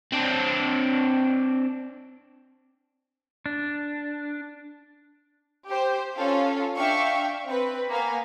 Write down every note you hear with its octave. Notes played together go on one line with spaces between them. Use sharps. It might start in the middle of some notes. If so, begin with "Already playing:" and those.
C4 D4
D4
G4 C5
C#4 F4 A4 F5
D4 E5 F5 G5 C#6
C4 B4
A#3 B3 F5 G#5